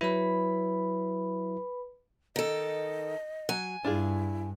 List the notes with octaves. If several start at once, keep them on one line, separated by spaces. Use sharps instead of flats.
F#3 E4 B4 B5
D#3 A4 D#5
F#3 G#5
G2 D4 E4 F4 G#4